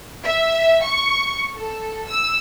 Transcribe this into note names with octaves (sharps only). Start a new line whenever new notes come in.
E5
C#6
A4
E6